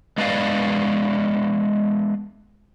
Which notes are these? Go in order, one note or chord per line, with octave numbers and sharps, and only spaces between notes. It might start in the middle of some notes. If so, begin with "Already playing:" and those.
G#3 B3 D4 B4 D5 F5